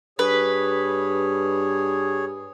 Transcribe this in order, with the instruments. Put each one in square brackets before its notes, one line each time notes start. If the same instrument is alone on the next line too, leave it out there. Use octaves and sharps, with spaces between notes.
[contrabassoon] G2 [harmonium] G#4 C#5 [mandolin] B4